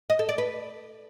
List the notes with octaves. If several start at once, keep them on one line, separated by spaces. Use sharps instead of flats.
D#5
A4
D5
B4